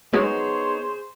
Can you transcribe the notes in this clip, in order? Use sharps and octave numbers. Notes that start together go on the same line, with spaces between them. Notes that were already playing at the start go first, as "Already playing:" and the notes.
F#3 G#3 B3 D#4 G#4 C5 C#5